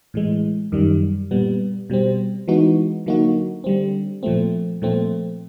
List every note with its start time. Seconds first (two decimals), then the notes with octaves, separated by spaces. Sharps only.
0.14 A2 E3 G#3
0.72 F#2 D#3 G3
1.31 A#2 G3 B3
1.90 B2 G3 C4
2.48 E3 G#3 B3 D#4 F#4
3.06 D3 F#3 A#3 D#4 F#4
3.64 D3 G3 C4
4.23 A#2 F3 A3 C4
4.82 A#2 F3 A3 C4